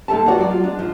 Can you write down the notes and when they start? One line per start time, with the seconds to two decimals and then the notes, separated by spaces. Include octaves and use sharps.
0.08 G#2 G#3 A#3 A4 E5 A5
0.26 F4 F#4 C#5 D5 E5 F#5
0.38 F#3 G#3 D5
0.51 F4
0.64 G#3 D4
0.78 G#2 F3